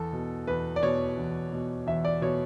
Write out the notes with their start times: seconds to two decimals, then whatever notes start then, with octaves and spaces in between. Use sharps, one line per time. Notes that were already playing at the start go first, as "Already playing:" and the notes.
Already playing: E2 A4
0.13 B2
0.47 E2 B4
0.76 D5
0.83 B2 C#5
1.18 E2
1.53 B2
1.86 E2 E5
2.05 D5
2.21 B2 C#5